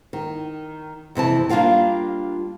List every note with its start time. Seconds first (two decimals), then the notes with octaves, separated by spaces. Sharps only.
0.13 D#3
1.15 F2 C3 E3 A5
1.49 G3 A#3 D4 F4 F5 G5